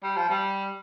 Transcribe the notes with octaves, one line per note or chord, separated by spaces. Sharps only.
G3
F3
G3